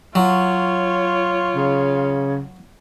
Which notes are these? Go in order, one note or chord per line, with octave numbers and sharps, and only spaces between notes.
F#3 F4 C#5
C#3